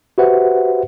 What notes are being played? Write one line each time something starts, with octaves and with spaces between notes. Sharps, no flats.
F#4 G4 B4 C5 E5 F#5